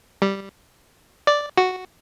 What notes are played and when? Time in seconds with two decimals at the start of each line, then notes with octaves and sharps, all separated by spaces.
0.22 G3
1.27 D5
1.57 F#4